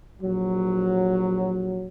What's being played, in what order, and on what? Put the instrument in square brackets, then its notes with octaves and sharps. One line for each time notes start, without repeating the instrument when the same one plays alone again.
[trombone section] A#1 F#3